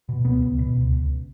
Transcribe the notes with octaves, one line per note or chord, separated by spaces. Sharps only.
B2
C#2 B3
C#2
B2
C#2
C#2